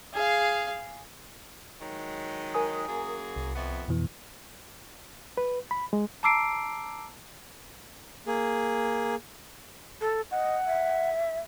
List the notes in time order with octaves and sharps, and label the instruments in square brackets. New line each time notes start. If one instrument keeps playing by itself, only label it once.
[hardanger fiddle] G#4 F5
[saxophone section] D#3 F#3 G#3
[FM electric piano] A#4 G#5 D#6
[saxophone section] F#2 A#3 G#4
[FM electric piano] C2
[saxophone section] F2 B3 E5
[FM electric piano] F2 B2 E3
[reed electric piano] B4
B5
G#3
[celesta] A5 A#5 D6 E6 C7 D7
[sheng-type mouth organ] A#3 G#4
[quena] A4
[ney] D#5 [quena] F#5
[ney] E5